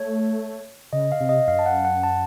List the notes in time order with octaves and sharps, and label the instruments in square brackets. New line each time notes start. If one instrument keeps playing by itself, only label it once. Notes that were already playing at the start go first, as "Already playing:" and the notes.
Already playing: [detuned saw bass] A3 [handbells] C#5
[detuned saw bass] C#3 [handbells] D#5
[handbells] F5
[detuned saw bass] C3
[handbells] D#5
[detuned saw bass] F#2 [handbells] F5
[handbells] A5
F#5
F#5
A5